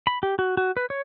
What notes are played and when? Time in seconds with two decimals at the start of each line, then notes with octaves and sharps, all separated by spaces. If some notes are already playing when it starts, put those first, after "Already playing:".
0.07 B5
0.23 G4
0.39 F#4
0.57 F#4
0.77 B4
0.90 C#5